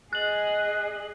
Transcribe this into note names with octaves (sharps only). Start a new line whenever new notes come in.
G#4 D#5 F#6 F#7